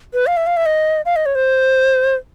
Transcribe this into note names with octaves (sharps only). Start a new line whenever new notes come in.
B4
F5
E5
F5
E5
D#5
F5
D#5
C#5
C5